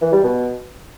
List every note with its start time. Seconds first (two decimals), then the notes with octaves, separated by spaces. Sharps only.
0.02 E3
0.13 G3
0.24 B2